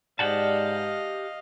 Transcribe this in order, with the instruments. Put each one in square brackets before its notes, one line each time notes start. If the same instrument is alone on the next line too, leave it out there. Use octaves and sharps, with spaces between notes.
[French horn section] G#2 D5 [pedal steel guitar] G4 F#5 A5 [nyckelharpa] D#5 F5